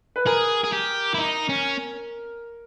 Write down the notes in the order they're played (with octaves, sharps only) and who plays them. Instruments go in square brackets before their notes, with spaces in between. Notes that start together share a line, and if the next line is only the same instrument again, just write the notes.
[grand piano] B4
[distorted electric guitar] G#4 [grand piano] A#4
[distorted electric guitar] G#4
G4
E4
D#4
C#4